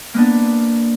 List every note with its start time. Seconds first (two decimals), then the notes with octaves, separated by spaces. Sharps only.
0.14 A#3 B3 D4